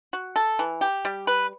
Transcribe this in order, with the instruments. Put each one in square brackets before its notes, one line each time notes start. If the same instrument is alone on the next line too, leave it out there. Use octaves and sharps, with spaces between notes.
[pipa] F#4
A4
E3
G4
G3
B4